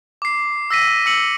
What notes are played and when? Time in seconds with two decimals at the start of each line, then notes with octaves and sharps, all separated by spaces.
0.22 D6 C7
0.71 E6 A#6 B6 D#7
1.06 E6 C#7 F#7